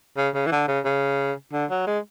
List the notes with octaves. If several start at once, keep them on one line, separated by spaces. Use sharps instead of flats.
C#3
C#3
E3
D3
C#3
C#3
D3
F#3
G#3